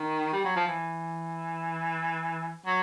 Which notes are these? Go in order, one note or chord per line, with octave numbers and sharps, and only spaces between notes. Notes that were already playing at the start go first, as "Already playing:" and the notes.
Already playing: D#3
G3
F#3
F3
E3
F#3